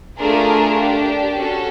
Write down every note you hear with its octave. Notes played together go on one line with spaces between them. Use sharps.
A3 D4 F4 G#4 A#4
D4 G4
C#4 F#4 A4